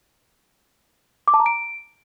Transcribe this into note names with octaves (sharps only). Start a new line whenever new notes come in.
D6
A5
A#5
D7